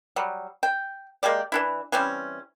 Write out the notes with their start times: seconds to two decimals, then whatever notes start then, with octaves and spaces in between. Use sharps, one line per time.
0.16 F#3 G3
0.63 G5
1.23 G#3 A#3 G4 D5
1.52 E3 D4 E4
1.92 E3 G3 C4 C#4